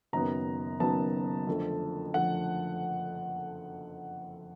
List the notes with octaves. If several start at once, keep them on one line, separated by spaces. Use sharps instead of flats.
F#1 F#2 D#3 F#3 B3 A#5
F#1 F#2 D#3 F#3 B3 A5
F2 D3 F3 A3
F2 D3 F3 A3 F#5